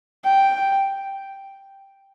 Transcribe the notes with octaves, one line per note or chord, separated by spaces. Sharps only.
G5